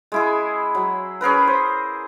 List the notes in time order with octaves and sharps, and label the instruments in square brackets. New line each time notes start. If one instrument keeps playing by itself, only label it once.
[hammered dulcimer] G#3 E4 G#4
F#3
C#4 G#4 A#4 B4
C5